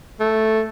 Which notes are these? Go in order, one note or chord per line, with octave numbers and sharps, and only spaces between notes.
A3